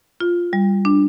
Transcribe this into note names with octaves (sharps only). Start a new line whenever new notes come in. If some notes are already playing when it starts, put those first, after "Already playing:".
F4
G3
D4